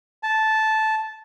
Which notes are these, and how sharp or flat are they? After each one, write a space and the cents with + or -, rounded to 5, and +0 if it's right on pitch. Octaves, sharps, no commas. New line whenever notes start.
A5 -10